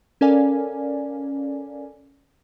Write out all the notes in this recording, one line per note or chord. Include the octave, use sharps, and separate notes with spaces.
C#4 A4 A#4 D5 F5 G#5